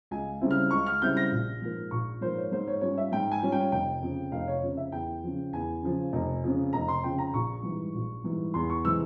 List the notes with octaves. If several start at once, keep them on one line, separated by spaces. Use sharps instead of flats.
C#2 G#5
C#3 G3 C4 E4
F6
C#2 C#6
F6
C#3 G3 C4 E4 G6
A#6
A#1
G#2 F3 A#3
A#1 C#6
G#2 F3 A#3 C5
C#5
G#2 C5
C#5
G3 C#4 F4 C#5
E5
G#2 G5
G#5
G3 C#4 F4
G5
F1 G5
F2 C#3
F1 F5
C#5
F2 C#3
E5
E2 G5
C#3 F3
E2 G#5
C#3 F3
F1
F2 C#3
F1 A#5
C6
F2 C#3 G5
A#5
A#1 C#6
G#2 E3 G3
A#1
G#2 E3 G3
E2 C6
C#6
C3 E3 G#3 E6